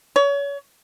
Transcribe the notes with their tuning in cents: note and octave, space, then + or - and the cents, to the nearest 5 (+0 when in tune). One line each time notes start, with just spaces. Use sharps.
C#5 +30